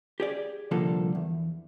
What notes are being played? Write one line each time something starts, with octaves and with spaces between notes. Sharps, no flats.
G4 G#4 D5
C2 D3 F3 G3 A#3 A4
E2